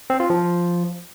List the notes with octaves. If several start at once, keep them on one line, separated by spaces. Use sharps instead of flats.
C4
F4
F3